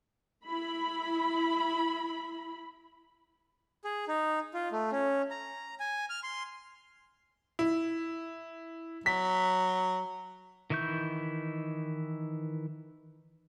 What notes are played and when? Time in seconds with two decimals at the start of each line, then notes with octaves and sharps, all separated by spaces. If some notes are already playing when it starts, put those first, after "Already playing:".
0.48 E4 B5
3.84 G#4
4.08 D#4
4.54 F4
4.72 A3
4.92 C#4
5.31 A#5
5.80 G#5
6.10 F6
6.23 C6
7.59 E4
9.06 F#3 B6
10.70 D#3 E3 E4 C#6 G6